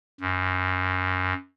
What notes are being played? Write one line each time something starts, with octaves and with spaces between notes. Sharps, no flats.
F#2